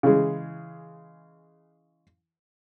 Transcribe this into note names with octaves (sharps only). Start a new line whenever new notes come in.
C#3 E3 G#3